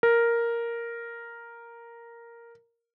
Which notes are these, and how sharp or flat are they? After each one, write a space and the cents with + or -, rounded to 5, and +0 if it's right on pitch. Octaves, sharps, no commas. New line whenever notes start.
A#4 +0